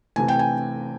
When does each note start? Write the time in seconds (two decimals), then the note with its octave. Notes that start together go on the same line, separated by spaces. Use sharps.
0.16 C3 E3 A3 G#5
0.28 G5
0.39 G#5